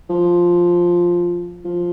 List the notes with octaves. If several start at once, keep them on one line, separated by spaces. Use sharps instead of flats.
F3
F3